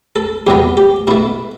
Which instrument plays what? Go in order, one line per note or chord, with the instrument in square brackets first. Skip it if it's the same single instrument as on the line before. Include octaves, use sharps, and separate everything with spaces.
[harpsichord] A4
E2 C3 F#3 B3 G4
G4
B2 A3 E4